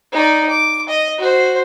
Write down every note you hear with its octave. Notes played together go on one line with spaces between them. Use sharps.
D#4 D5
D6
D#5
F#4 C5